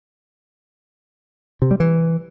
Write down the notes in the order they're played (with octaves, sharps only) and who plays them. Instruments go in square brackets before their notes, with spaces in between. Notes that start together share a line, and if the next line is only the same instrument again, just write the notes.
[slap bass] C3
G3
E3